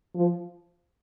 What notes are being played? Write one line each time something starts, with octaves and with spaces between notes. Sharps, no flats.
F3